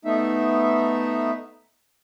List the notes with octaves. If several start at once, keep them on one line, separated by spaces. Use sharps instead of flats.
A3 B3 D#4 E5